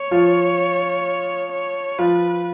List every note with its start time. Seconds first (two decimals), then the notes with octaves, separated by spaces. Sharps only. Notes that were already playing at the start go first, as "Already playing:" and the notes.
Already playing: C#5
0.11 F3 F4
1.52 C#5
1.98 F3 F4 B4